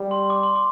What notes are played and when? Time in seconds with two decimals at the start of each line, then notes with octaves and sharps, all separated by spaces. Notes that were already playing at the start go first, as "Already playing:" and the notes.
Already playing: G3
0.11 C6
0.30 D6
0.43 C6
0.56 D6